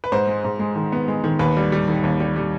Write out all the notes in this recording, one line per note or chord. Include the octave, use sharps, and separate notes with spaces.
B4
G#2 C5
G#3
G#2
G#3
D#3
B3
G#3
D#3
D#2 B4
G3
G3
D#3
D#2
G3
G3